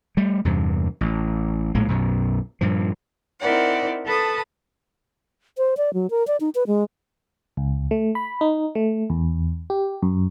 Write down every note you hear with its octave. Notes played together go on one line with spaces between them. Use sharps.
G3 A3
E2 G2 C3
A1
A#1 A2 G#3 A#3
B1 F#2 B2
G2 A#2 F3
C4 D#4 E4 A#4 D5 F#5
A4 B4 A5 B5 D#6
C5
D5
F#3
A#4
D5
D#4
B4
G#3
C#2
A3
B5
D#4
A3
E2
G4
F#2